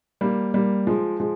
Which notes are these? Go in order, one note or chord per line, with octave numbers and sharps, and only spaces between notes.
G3 A#3
G3 A#3
F3 G#3
F3 G#3